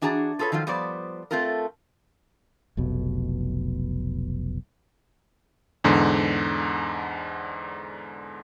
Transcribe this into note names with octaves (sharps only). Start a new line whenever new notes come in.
E3 D4 F#4 G#4 A#5
F4 G#4 A4 B4 C#5
D#3 F3 F#3 F4
F3 G3 B3 C5 D5
A3 C4 F4 A4 A#4
F1 B1 B2
E2 G#2 D3